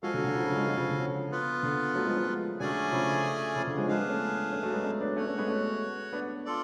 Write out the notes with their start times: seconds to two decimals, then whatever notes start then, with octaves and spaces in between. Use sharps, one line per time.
0.03 F3 G#3 F#4 A4 F5 G#5
0.14 D3 F#3
0.24 D3
0.35 C#3 F3
0.45 C#3 F3
0.56 F3 G#3
0.67 F3 G#3
0.77 C#3 F3
0.88 D3
0.99 C#3
1.31 B3 F4 B4
1.63 D3
1.95 F#3 A3
2.06 F3 G#3
2.16 F3 G#3
2.27 F3 G#3
2.59 D3 F#3 A3 C#4 G#4 D5 G#5
2.92 C#3 F3
3.56 C#3 F3
3.67 D3
3.77 F3 G#3
3.88 F3 G#3 D4 G#4 B4 F5
3.98 G#3 B3
4.10 A3 C#4
4.52 A3 C#4
4.63 F#3 A3
4.73 G#3 B3
4.84 A3 C#4
5.01 B3 D4
5.16 A3 C#4 F#4 C#5 F#5
5.27 A3 C#4
5.38 G#3 B3
5.48 A3 C#4
6.13 B3 D4
6.45 F4 A4 D5